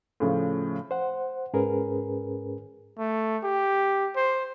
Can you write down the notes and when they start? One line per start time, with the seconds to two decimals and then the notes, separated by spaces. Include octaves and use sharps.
0.20 A2 C#3 F3
0.91 C5 F#5
1.53 G#2 C#4 G#4 A#4 B4
2.99 A3
3.44 G4
4.16 C5